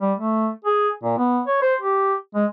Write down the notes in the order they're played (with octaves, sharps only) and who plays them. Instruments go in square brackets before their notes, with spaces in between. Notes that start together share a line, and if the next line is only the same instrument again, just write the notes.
[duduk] G3
A3
G#4
A#2
B3
C#5
C5
G4
G#3